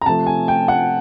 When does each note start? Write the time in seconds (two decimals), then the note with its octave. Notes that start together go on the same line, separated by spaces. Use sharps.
0.01 A#5
0.06 C3 F3 A3 A5
0.27 G#5
0.48 G5
0.68 F#5